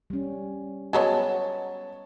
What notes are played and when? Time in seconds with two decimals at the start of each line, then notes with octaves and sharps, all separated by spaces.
0.10 G3 C#4
0.93 F#3 G#3 B3 C#5 A5